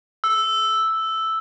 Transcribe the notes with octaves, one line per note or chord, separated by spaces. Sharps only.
E6